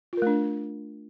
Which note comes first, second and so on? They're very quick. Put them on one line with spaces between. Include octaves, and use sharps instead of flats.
F4 A#4 A3 D4